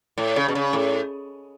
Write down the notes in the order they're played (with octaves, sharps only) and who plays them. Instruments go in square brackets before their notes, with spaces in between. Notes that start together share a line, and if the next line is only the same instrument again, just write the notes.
[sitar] A2
C#3
B2
C#3
A2